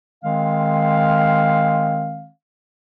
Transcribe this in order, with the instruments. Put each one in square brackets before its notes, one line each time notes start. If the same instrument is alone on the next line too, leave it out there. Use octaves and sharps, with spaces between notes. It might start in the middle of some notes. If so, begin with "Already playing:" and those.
[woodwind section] D#3 G#3 C4 F5